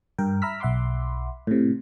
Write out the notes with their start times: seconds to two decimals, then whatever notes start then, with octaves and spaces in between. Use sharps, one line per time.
0.18 G2 A#4 G5
0.42 E5 A#5 B5 E6 F6 B6
0.60 B1 E5 F#5 B5 C6 D6
1.47 A2 C3